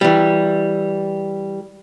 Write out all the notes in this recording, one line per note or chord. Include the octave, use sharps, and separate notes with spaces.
E3 G3